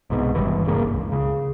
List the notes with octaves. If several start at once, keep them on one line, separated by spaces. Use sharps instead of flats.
C2 G#2 B2
G#1 G2 E3
D#1 G2 C#3 A#3
C#2
C#3